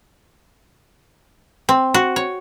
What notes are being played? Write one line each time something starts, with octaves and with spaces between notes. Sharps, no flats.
C4
F#4
C#5